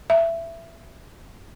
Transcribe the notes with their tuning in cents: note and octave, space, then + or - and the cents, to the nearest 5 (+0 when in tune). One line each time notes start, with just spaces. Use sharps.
E5 +15